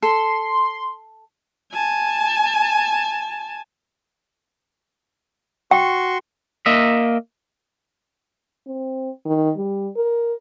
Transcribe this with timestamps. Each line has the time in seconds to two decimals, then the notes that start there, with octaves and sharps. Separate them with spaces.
0.02 A4 C6
1.72 G#5 A5
5.71 F#4 G5 C6 C#6
6.66 A#3 D#5 E5
8.67 C4
9.25 D#3
9.56 G3
9.96 A#4